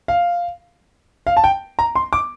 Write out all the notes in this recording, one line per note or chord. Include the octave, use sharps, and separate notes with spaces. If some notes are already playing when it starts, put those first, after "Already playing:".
F5
F5
A5
G5
A#5
C6
D6